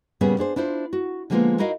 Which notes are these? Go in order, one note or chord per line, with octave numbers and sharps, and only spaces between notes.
A#2 C#3 G3 B3 C#4 G#4
D4 G#4 C5
D4 E4 F4 C5
F#4
D3 F3 G#3 A#3 B3 F4
D#4 E4 F#4 A#4 D#5 F5